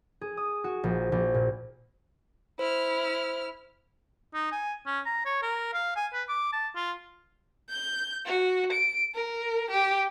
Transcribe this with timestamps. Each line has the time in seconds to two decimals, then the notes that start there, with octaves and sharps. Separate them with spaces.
0.21 G#4
0.37 D#6
0.64 F#4
0.84 A#1
1.12 A#1
1.34 A#2
2.59 E4 C5 F6
4.34 D#4
4.52 G#5
4.86 C#4
5.06 A#5
5.25 C#5
5.42 A#4
5.74 F5
5.96 G#5
6.13 B4
6.29 D6
6.53 A5
6.76 F4
7.69 G6
8.26 F#4
8.73 D7
9.15 A#4
9.71 G4